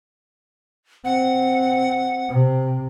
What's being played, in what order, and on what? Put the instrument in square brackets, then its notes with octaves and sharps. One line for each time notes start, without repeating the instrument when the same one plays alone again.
[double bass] C4 [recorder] F#5
[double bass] C3 C4